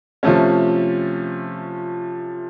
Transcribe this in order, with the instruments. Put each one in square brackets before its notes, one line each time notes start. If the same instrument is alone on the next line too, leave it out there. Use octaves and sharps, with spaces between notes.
[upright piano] C3 F3 A3 C#4